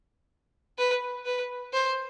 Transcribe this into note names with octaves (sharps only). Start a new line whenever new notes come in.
B4
B4
C5